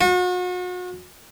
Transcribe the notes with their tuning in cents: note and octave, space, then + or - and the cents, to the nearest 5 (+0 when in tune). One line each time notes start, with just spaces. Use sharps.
F#4 -40